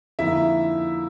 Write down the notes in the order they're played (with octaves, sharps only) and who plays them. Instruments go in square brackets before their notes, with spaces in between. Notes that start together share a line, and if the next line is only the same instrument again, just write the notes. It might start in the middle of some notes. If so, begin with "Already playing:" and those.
[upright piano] F2 D3 F3 A#3 D#4 E4 E5